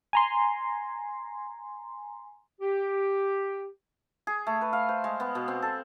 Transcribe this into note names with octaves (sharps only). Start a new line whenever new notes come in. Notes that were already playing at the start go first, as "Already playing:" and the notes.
G#5 A#5 C6
G4
G#4
A3
B4
F5
C5
G#3
B3
B2
C4
A4